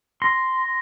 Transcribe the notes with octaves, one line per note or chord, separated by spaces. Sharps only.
C6 A#6